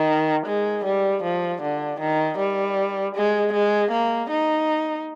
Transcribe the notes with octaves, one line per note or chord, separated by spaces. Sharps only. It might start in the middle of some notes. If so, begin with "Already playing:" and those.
Already playing: D#3
G#3
G3
F3
D3
D#3
G3
G#3
G#3
A#3
D#4